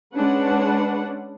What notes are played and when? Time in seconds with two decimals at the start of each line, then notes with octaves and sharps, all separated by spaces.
0.15 G#3 C#4 D4 B4 F#5